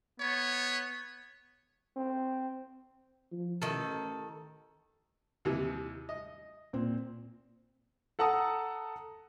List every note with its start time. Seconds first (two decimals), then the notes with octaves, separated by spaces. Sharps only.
0.20 B3 C#5
1.96 C4
3.32 F3
3.62 A1 D#3 A4
5.45 D#2 C3 E3
6.09 D#5
6.73 A#2 C4
8.19 A4 F#5 A5 A#5 D#6